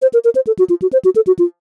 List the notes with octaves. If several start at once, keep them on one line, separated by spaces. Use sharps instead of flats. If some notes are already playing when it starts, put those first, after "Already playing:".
C5
A#4
A#4
C5
A4
F#4
F4
F#4
C5
F#4
A4
F#4
F4